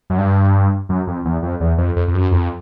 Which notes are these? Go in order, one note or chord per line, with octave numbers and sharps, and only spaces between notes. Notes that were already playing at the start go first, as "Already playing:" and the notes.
F#2
G2
F#2
F2
E2
F2
E2
F2
F2
F2
F#2
F2